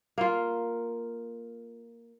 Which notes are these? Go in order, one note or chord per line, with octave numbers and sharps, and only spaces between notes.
A#3 F4